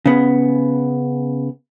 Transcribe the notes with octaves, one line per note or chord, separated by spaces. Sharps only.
C#3 B3